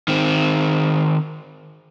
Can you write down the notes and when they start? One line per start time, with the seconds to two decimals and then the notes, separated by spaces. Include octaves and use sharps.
0.08 D#3 C4